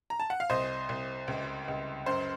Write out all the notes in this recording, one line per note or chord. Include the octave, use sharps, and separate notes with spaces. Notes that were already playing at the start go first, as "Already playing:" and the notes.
A#5
A5
F#5
F5
C2 C5 D#5
C2
C#2
C#2
F#2 C5